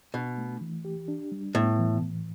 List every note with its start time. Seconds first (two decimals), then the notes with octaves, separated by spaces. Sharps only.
0.14 B2 D4
0.38 A3
0.61 E3
0.85 G4
1.08 D4
1.32 G3
1.55 A2 B3
1.79 E3
2.02 A2